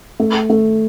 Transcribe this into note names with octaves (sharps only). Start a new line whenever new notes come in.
A3
A3